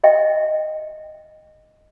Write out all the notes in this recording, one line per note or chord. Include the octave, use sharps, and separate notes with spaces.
D#5 E5 G5